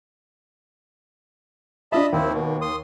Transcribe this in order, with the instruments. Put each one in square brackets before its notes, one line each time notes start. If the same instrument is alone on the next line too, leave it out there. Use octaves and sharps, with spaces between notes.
[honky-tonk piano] D4 F4 E5 [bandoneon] D#5 A5 B5
[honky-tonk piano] D#2 [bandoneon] F3 C4 E4
[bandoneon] B2
C6 D#6